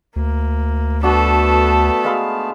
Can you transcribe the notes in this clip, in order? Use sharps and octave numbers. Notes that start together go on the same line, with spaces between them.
D2 A#3
A3 B3 D4 F#4 A4 B4 A5
G#3 F5 B5